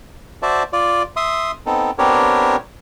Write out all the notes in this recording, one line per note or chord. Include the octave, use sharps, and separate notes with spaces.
F#4 C5 D5 E5 A5
F4 D5
E5 C6 D#6
B3 C4 D#4 A4
B3 C4 D4 G4 A#4 C#5